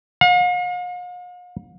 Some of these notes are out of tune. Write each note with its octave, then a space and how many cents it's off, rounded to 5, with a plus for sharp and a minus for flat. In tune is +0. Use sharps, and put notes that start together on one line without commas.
F5 +45